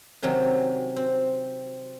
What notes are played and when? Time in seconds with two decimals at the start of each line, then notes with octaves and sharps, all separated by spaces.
0.22 C3 D#3 F#3 C#4
0.96 C4